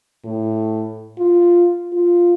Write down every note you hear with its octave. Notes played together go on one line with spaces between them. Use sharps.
A2
F4
F4